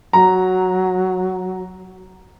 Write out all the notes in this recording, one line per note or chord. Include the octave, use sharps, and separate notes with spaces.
F#3 A#5